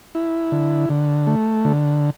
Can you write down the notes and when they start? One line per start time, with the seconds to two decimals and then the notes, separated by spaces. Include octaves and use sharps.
0.15 E4
0.52 D3
0.90 D3
1.27 A3
1.65 D3